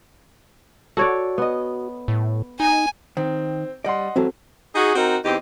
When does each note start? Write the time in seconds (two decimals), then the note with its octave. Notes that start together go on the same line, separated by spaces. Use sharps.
0.97 F#4 A4 C#5 D5
1.38 B3 D#5
2.08 A2
2.60 D#4 G#5
3.17 D#3 C4
3.84 G3 D5 D#5 F#5 C6
4.16 G#2 E3 F#3 C4 F#4 A4
4.75 D#4 F#4 G#4
4.96 C4 D#4 F#4 A#4
5.25 E2 C4 D#4 G4